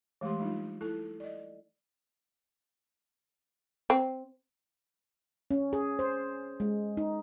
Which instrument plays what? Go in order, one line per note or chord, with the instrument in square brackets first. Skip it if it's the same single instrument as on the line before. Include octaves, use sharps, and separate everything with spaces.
[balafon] E3 G#3 A3 G4 C6
G3 G#3 D4 D#4 F4
E4 A4 A5
D5 D#5
[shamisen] C4
[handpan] C#4
G#4
C5
G#3
D#4